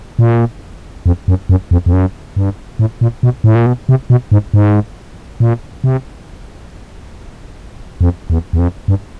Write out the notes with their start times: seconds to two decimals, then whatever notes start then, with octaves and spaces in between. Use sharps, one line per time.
0.19 A#2
1.06 F2
1.28 F#2
1.49 F#2
1.71 F2
1.86 F2
1.93 F#2
2.36 G2
2.79 A2
3.01 A#2
3.23 B2
3.44 A2
3.55 A#2
3.66 B2
3.89 C3
4.10 B2
4.32 G#2
4.54 G#2
5.40 A#2
5.84 C3
8.01 F2
8.30 E2
8.53 E2
8.59 F2
8.88 G2